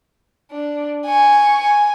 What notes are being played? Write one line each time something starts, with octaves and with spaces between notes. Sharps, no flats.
D4
G#5 C#6
G#5